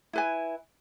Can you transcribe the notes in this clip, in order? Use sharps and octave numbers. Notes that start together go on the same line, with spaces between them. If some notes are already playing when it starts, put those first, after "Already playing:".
E4 B4 G#5